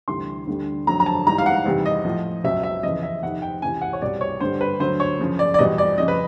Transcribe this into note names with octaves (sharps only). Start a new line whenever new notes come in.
D2 C3 E3 G3 C6
D2 D3 G3
F2 D3 F#3 A#5
A#5
A5
G#2 E3 G3 A#5
F5
F#5
E2 C3 D#3 G3
D#5
A2 F3
C#2 B2 F#3 E5
E5
E2 C#3 F3 D#5
E5
F2 C3 D#3 F#5
G5
C#2 C3 E3 G#5
F#5
C#5
C2 B2 G3 D5
C#5
G2 D3 G3 C5
B4
D2 D3 F#3 C5
C#5
F#2 C#3 F3
D5
D5
E2 B2 G3 D#5
D5
F2 C#3 F3 D#5
B4